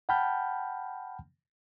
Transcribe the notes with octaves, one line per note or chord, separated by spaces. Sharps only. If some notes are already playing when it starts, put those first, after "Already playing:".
F#5 G5 A5 B5 F6 G6